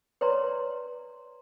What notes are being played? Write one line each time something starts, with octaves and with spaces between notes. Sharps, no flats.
B4 C#5 D5 A#5 C6